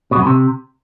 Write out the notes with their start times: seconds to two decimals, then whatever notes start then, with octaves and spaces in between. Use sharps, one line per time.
0.11 B2
0.16 F#2
0.21 B2
0.26 C3